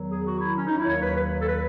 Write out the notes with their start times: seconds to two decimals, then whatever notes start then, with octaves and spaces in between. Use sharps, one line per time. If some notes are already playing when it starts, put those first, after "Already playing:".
Already playing: E2 D#3 F#3
0.10 G#4
0.25 F#4
0.40 E4
0.56 C#4
0.66 D#4
0.76 E4
0.85 D#2 D#3 F#3 C#5
1.01 B4
1.15 B4
1.41 A4
1.47 B4